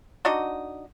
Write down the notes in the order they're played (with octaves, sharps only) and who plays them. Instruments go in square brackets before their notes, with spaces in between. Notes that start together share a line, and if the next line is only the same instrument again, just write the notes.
[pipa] D4 D#4 F#4 D#5